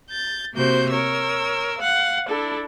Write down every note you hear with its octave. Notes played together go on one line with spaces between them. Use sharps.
G6 A6
C3 A#3 F#4 C5 G6
A#4 C#5 E6
F5 F#5
D4 E4 A4